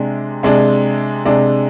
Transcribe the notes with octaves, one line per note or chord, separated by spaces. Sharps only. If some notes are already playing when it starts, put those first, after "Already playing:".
Already playing: C3 G#3 D4
C3 G#3 D4
C3 G#3 D4